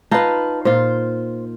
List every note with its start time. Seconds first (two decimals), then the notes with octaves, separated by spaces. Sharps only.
0.11 D#4 F4 B4 A5
0.65 A#2 F4 C5